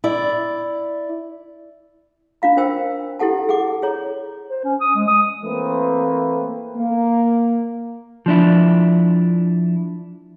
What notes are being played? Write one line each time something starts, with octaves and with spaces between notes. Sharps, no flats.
E4 D5
D4 F4 F5 A#5
D4 A#4 C5 G5 E6
E4 G4 A4 F#5 A5
G#4 A4 F#5 D6
G#4 C#5 A#5
C5
C#4
D#6
G#3
D#6
E3 A3 A#3 C4 B4
A#3
F3 D4 E4